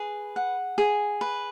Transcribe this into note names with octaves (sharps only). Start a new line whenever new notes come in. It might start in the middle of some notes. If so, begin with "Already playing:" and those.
Already playing: G#4 B4
F#5
G#4
B4